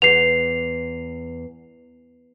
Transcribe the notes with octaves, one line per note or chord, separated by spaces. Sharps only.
E2 C7 F7